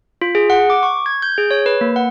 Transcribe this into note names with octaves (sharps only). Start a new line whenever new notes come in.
F4
G#4
F#5
D6
C#6
G#6
G6
G#4
C#5
B4
A#3
F#5